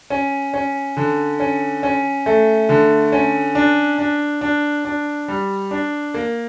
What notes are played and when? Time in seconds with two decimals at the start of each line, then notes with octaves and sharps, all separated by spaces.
0.10 C#4
0.54 C#4
0.97 D3
1.40 C#4
1.83 C#4
2.26 A3
2.69 D3
3.12 C#4
3.55 D4
3.98 D4
4.41 D4
4.85 D4
5.28 G3
5.71 D4
6.14 A#3